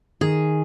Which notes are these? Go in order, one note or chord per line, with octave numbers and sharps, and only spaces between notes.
D#3 G#4